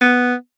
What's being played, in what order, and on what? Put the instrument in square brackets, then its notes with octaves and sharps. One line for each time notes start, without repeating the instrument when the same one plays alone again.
[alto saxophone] B3